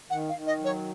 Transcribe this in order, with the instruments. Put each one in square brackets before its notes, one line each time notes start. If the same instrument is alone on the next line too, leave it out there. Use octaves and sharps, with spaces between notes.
[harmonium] D#3 [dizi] F#5
[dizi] F5
[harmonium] D#3
[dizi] D#5
[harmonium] F#3
[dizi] C#5